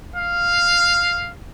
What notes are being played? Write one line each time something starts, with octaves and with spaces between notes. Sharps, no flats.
F5